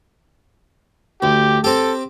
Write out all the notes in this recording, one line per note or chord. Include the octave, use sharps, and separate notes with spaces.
D2 G4
C4 G4 A4